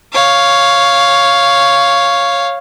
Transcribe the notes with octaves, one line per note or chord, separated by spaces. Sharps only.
C#5 F5